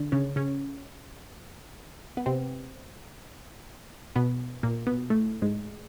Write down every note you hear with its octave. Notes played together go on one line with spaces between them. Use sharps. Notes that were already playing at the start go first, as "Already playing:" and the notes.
Already playing: D3 D4
C#3 C#4
C#3 C#4
B3
C3 C4
B2 B3
A#2 A#3
B2 B3
A2 A3
G#2 G#3